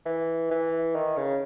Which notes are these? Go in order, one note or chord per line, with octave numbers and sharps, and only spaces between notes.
E3
E3
D#3
C#3